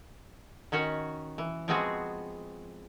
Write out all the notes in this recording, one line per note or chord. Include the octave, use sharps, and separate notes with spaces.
D#3 C#4 F#4 C#5
E3
F3 G#3 B3 C4 F#4 G#4